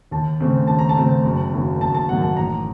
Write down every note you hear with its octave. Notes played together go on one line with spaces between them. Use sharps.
D#2 A5
C#3 A3 C4
D#2 A5
A#5
A5
C#3 A3 C4
F#1
F#2 D#3 A#3
F#1 A5
A5
F#2 D#3 A#3 F#5
A5
A1 A#5